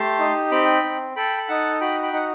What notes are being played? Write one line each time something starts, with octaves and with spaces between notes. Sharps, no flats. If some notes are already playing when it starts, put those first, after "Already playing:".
Already playing: A3 G4 A5 C6
D#4
C4 G5 B5
C4
A4 G5 B5
B5
D#4 F#5 A5
F#4 G5 B5
G5 B5
D#4 F#5